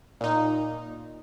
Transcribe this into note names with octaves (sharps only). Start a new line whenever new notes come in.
A#2 D#4